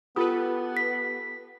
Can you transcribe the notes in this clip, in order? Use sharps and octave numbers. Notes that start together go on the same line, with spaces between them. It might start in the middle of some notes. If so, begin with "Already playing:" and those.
B3 F4 G4 A4 B4 D#6
B6